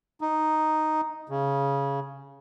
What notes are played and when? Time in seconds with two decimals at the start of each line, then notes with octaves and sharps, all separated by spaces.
0.21 D#4
1.29 C#3